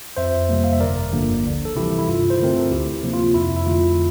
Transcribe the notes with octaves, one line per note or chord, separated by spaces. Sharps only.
F2 C5 E5
C3 G3 A#3
F5
E5
G1 A#4 D5
G2 D3 F3 A#3
D2
A4
C3 E3 G3 E4 G4
E4
G2 F4
C5
D3 A3 C4 A#4
A4
D2 E4 G4
C3 F3 A#3
F4
F2 E4
E4
D3 A3 F4